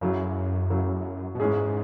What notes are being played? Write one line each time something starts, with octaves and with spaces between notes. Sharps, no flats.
F#2 C#3 F#3 E4
C#3 F#3 E4
B2
E2 G#2 E3 G#3 C#4 G#4